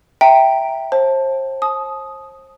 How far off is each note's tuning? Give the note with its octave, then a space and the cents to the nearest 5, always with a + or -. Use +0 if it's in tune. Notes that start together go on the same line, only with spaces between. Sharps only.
E5 +0 G5 +0 A#5 -5
C5 +35 A5 +0
A5 -35 D#6 +0